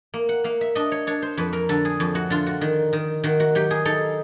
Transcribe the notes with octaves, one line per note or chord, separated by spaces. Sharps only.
A#3
F#5
A#3 F5
E5
D4 D#5
C#5
D4 C#5
C5
F2 B4
A#4
D3 A4
G#4
F2
F#4
D3 F4
F#4
D#3
D#3
D#3 F#4
F#4
F#3 G4
G#4
D#4 A4